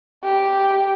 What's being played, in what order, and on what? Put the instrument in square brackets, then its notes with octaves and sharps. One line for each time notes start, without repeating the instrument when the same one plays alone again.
[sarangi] G4